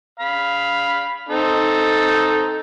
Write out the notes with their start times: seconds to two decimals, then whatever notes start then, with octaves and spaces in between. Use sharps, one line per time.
0.20 F5 B5
1.29 C4 D#4 A4